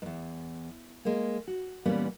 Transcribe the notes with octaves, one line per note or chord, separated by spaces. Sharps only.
E2 G#2
G#3 A#3
F#4
A#2 E3 G3 A#3 B3 C#4